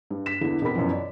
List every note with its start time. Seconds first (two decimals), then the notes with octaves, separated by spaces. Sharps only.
0.11 G2
0.26 B6 E7
0.41 E2 D3 E3
0.61 E2 B2 C4 A#4 B5 B6
0.76 F#2 B2 E3 F3
0.91 D5